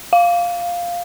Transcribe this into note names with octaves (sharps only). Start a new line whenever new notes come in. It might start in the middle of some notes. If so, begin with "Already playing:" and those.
F5